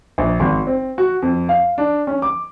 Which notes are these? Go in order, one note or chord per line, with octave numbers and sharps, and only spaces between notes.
A#1
G#1
C4
F#4
F2
F5
D4
C#4
D6